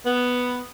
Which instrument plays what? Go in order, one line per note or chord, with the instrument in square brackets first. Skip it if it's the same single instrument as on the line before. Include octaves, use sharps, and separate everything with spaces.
[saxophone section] B3